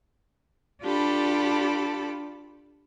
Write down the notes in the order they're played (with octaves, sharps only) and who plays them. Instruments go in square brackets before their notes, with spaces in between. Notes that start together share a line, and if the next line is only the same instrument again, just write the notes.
[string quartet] D4 F4 G4 A4 B5